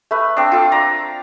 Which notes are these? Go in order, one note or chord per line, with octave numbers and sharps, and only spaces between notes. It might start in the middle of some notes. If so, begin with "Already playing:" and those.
A3 B4
C4 D4
F4 A4
D5 A#5